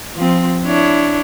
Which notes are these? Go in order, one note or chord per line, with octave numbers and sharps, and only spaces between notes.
F3 C4
D4 E4 C#5